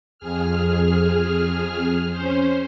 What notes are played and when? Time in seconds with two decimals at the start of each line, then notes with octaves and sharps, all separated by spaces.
0.19 F2 G#4 F6
2.12 C#4 C5